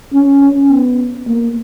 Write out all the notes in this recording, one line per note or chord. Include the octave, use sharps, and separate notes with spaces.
C#4
C#4
B3
A#3